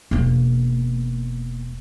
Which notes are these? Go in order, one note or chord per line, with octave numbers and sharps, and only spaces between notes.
E1 A#3